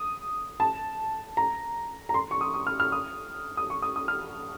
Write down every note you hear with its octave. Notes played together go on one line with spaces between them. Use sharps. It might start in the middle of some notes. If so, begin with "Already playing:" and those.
Already playing: D#6
A5
A#5
A#5
C6
C#6
D#6
D#6
F6
F6
D#6
D#6
C#6
D#6
D#6
F6